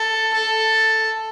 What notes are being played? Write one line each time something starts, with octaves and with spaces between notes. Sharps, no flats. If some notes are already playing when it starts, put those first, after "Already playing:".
Already playing: A4
A4